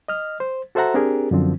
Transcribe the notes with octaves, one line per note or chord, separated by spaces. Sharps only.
D#5 F6
C5
F#4 A4 C5 E5 F#5 A#5
C4 D4 G4 G#4 A#4
F#2 D3 F3 C4